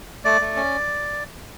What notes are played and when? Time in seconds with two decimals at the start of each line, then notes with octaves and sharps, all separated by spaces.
0.25 A3 D5
0.41 A3
0.56 C#4